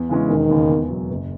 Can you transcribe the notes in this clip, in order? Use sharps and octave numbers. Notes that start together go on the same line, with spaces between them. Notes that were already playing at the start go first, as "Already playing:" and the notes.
Already playing: E2
C#3 E3 G#3 C#4
E1 D#3
D#2 C#3
E2
B2 F#3
F#1